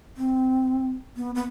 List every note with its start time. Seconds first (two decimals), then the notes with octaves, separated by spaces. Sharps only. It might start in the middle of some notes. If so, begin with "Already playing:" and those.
0.17 C4
1.17 B3
1.35 B3